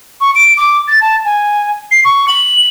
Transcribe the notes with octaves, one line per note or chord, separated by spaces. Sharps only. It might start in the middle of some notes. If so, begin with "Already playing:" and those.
C#6
D7
D6
A6
A5
G#5
C7
C#6
F#7